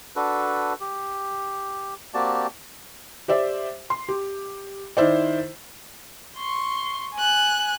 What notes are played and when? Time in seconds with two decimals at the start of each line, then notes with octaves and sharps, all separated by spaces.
0.16 D4 F#4 A4 B4
0.80 G4
2.14 A#3 C4 F#4 G4 D5 A5
3.28 G4 C5 D5 E5
3.90 C6
4.09 G4
4.97 D#3 E4 C5 D5
6.38 C6 C#6
7.15 G#5 F#6